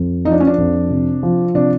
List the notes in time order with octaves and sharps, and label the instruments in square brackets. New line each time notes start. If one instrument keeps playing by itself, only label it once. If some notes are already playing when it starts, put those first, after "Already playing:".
Already playing: [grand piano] F2
[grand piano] F3 [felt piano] D#4
[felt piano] D4
C#4
D4
[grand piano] F2
C3
F3
[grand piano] C3 [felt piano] D4